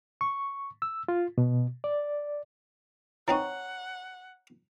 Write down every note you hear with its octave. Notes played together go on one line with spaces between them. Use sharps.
C#6
E6
F4
B2
D5
E3 C4 D#4 C#5 F#5 A#5 C#6